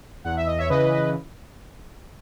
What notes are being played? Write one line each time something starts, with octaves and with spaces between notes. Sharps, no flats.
E2 F#5
E5
D#5
C#5 E5
C#3 E3 B4 D#5